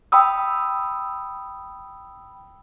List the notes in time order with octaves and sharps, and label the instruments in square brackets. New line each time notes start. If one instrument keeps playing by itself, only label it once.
[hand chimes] G5 B5 D#6 E6